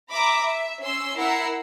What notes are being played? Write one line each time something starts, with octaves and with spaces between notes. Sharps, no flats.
E5 A#5 B5 D6
E5
C#4 C6 E6
E4 A#4 F#5 E6 C7